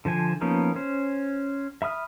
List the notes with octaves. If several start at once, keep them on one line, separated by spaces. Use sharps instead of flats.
D3 F3 C5 G#5
F3 A#3 B3 C#4 D#4
C#4 C5
E5 B5 D#6 F6